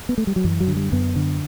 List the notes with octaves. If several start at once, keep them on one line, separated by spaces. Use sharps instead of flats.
B3
A3
G3
F#3
F#2 E3
F#3
D3
G3
F#2 B3
D3